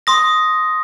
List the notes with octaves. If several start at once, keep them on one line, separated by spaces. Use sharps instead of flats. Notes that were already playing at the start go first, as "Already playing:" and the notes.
C6 D#6 A#6